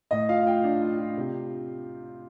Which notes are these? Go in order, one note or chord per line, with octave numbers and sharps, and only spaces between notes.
A2 D#5
F4 F5
F4 G5
D4
F4
F4
C3